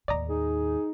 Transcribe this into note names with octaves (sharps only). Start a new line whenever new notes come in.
D#2 A2 D5 D#5 A#5
D#4 G#4